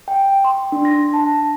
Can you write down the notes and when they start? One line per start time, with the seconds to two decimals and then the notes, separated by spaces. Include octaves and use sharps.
0.08 G5
0.44 C6
0.72 D4
0.85 A#6
1.13 A5